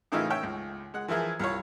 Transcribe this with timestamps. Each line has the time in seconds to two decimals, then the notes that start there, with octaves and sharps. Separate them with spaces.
0.12 A2 C#3 E3 D#4 F4 E5
0.30 C#5 E5 G5
0.43 C#2
0.94 G#3 F#5
1.08 E3 F3 E4 G#4 A#4
1.39 C2 F4 C#5